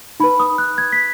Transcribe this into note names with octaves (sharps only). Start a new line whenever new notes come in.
D#4 B4 B5
D#6
F#6
G#6
B6